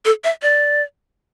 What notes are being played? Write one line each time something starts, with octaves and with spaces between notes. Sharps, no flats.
A4
E5
D5